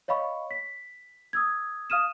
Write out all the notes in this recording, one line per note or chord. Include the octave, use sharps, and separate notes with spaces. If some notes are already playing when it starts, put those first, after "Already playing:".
C#5 D#5 F5 B5 C#6
B6
D#6 E6 G#6
F5 D#6 F6 D#7 E7